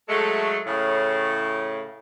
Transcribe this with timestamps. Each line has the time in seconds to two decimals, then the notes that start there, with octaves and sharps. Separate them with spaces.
0.09 F#3 G#3 A3
0.66 A2 C#3